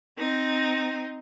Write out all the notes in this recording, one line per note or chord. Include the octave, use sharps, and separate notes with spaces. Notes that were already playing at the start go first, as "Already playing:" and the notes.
C4 D#4